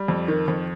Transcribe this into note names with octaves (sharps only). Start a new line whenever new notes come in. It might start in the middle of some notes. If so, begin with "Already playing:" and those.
Already playing: G3
F2
D#3
F2